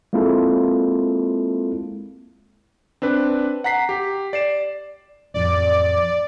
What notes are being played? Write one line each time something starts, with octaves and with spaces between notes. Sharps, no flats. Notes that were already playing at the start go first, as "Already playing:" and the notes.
G#3 A#3 C4 E4 F4 A4
C4 D4 B4
F#5 A#5 B6 C7
G4
D5 C7 E7
A1 F2 D5